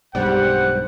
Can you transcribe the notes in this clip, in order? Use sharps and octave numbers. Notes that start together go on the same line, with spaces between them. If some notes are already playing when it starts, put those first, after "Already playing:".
B1 G2 G3 G#3 C5 F#5